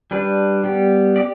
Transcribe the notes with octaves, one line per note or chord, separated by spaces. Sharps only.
G3 D4 B4
G3 B3 G4
G4 D5